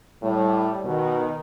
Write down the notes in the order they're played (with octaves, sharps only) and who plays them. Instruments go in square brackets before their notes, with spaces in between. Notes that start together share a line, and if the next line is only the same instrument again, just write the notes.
[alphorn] A2 [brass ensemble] G3
[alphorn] B2 [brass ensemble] D#3